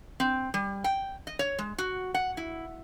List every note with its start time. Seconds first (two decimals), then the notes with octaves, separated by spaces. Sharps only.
0.20 C4
0.54 G3
0.84 G5
1.27 D#5
1.39 C#5
1.59 G#3
1.78 F#4
2.14 F#5
2.37 E4